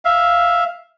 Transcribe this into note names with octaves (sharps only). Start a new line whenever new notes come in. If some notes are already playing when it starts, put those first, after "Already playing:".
E5 F5